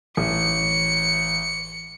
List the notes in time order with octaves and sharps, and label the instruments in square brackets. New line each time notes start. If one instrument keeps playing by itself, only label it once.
[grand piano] A1 [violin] C#7